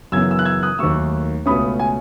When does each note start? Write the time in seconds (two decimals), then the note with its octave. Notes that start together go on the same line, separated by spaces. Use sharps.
0.12 F#2 C#3 E3 B3 E6 G#6
0.31 E6
0.39 F#6
0.45 E6 G#6
0.63 D#6 F#6
0.79 D#2 D#3 F#3 A3 C#6 E6
1.46 C#2 B2 A3 C#4 B5 D#6
1.80 G#5